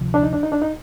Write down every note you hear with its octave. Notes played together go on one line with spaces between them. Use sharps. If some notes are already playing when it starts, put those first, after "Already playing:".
Already playing: D2 C3 F3
D4
D#4
D4
D#4
D4
D#4